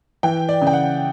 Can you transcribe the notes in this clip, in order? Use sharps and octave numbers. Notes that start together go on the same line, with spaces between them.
E3 G5
D5
C#3
G5
F#5